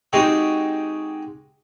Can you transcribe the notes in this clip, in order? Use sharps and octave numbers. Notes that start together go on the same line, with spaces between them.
G#3 C4 D#4 F#4 G4